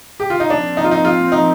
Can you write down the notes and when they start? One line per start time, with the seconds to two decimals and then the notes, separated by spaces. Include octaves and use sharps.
0.20 G4
0.30 F4
0.40 D#4
0.50 A#2 F3 C4 D4
0.77 D#4
0.84 F4
0.91 D#4
1.05 F4
1.32 D#4